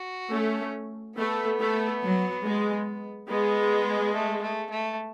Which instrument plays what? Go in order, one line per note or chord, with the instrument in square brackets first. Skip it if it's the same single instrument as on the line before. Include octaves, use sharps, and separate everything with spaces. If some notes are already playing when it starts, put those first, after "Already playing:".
Already playing: [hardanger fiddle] F#4
[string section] A3 [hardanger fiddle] C#4
[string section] A3 [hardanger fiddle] B3
[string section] A3
F#3
G#3
[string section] G#3 [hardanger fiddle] B3
[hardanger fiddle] A3
A3
A3